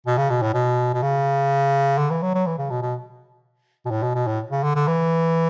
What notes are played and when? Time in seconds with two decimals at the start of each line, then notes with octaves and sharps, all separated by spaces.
0.06 B2
0.18 C#3
0.30 B2
0.42 A2
0.54 B2
0.94 B2
1.02 C#3
1.98 D3
2.10 E3
2.22 F#3
2.35 F#3
2.47 E3
2.58 C#3
2.70 B2
2.82 B2
3.86 B2
3.91 A2
4.03 B2
4.15 B2
4.27 A2
4.51 C#3
4.64 D3
4.75 D3
4.87 E3